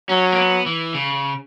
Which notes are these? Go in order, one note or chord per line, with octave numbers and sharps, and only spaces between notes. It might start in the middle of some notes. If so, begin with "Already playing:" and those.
F#3 C#4
A#3
B3
E3
C#3